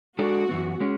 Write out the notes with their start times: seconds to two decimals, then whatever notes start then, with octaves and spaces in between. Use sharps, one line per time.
0.19 G#3 D4 F#4 A4 D5
0.49 F#2 E3 B3
0.80 G#3 C#4